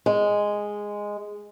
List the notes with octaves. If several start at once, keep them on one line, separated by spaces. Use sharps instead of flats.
G#3